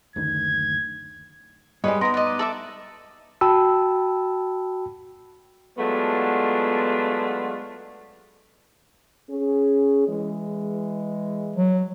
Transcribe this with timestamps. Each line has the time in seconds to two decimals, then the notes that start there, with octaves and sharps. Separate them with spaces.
0.16 F#1 D2 D#3 G#6
1.84 G2 G3 G#3 B4 C#5 D#5
2.01 B3 D#4 A#4 C6 D#6
2.14 B4 D5 D#5
2.27 D#7
2.39 A4 E5 D6 F#7
3.41 F#4 G5 A5 B5 E6
5.77 F#3 G#3 A3 B3 D4 F4
9.29 C#4 G#4
10.08 E3 G#3
11.56 F#3